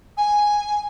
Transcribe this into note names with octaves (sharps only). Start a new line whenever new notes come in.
G#5